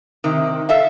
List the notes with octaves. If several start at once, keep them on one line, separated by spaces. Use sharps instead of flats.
C3 D#3
A4 E5 F5